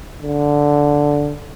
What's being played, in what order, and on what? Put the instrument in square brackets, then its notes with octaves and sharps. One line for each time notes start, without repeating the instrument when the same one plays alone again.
[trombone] D3